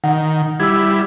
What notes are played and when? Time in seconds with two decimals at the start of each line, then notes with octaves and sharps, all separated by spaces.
0.04 D#3 F#5
0.60 G3 E4 E6 G#6